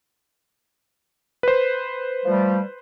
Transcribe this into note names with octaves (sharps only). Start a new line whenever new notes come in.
B4 C5
F3 G3 A3